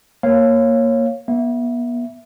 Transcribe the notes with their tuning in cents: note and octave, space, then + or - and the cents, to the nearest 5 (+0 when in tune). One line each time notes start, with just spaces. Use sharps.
A#3 +0 C#5 -15 F5 -5
B3 -35 E5 +0